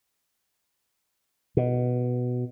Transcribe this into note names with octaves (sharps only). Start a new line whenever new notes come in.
B2